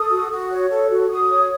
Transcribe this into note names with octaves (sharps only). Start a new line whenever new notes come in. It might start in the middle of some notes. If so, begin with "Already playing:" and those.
Already playing: A4 D#6
F#4
F#4
C#5
A4
F#4
F#4 D#6
C#5